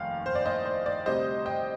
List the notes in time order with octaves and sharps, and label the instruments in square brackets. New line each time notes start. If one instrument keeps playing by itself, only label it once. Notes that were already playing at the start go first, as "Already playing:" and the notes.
Already playing: [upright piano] F1 D#2 D#3 F5
C5
D5
C5 D#5
C5
D5
D2 C3 G3 C5 D#5
D#5 G5